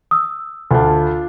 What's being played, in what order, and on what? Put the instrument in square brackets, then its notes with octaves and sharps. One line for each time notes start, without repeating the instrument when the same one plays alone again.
[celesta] D#6 E6
[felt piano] D2 [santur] D4 F4